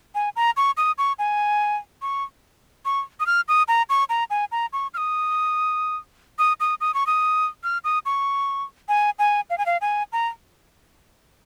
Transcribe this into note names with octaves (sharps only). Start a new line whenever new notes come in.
G#5
A#5
C#6
D#6
C#6
G#5
C#6
C#6
D#6
F6
D#6
A#5
C#6
A#5
G#5
A#5
C#6
F6
D#6
D#6
D#6
D#6
C#6
D#6
F6
D#6
C#6
G#5
G#5
F5
G#5
F5
G#5
A#5